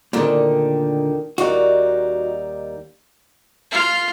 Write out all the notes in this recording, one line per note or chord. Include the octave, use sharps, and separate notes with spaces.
D2 A#2 D3 D#3
D#2 G3 D#4 F#4
F4